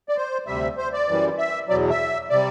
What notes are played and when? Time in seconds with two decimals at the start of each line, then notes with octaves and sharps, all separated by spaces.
0.09 D5
0.16 C5
0.47 D2 C3 G3 E5
0.78 C5
0.93 D5
1.08 F#2 E3 G3
1.38 E5
1.68 E2 B2 F#3 D5
1.90 E5
2.30 C3 G3 D5